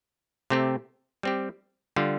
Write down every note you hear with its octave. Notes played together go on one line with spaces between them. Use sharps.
C3 A3 C4 G4
G3 C4 G4
D3 G3 F4